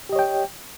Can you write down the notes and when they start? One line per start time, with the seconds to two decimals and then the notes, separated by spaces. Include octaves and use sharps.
0.09 G4
0.13 D#5
0.16 C#5
0.19 G5